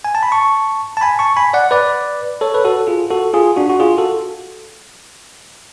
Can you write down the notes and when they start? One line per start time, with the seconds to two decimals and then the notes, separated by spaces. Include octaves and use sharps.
0.05 G#5
0.15 A5
0.23 B5
0.32 A5 C#6
0.97 A5
1.01 G#5 B5
1.19 A5 C#6
1.37 G#5 B5
1.53 D5 F#5
1.71 B4 D5
2.41 A4 C#5
2.54 B4
2.65 F#4 A4
2.87 F4 G#4
3.10 F#4 A4
3.33 F4 G#4
3.56 D4 F#4
3.70 F#4
3.80 F4 G#4
3.98 F#4 A4